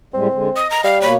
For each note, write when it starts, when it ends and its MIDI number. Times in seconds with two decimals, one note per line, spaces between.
0.14 0.27 45
0.14 0.27 55
0.14 0.27 56
0.14 0.64 60
0.33 0.49 50
0.33 0.49 56
0.56 0.88 75
0.56 0.67 87
0.70 0.84 82
0.84 1.06 55
0.84 1.01 77
1.01 1.16 47
1.01 1.16 58
1.01 1.16 73
1.01 1.12 83